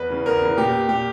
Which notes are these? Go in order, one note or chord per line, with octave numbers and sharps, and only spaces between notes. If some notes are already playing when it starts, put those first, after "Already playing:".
Already playing: E2 B4
C#3 E3
E2 A#4
C#3 E3
A#2 G4
A#2 G4